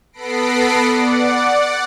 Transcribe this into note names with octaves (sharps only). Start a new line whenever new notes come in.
B3 A4 B5 A#6 C7 D7
D5 F#5